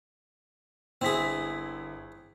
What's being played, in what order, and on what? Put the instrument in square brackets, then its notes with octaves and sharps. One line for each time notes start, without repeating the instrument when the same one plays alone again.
[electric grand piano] G1 E4 B6 [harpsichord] C4 G#4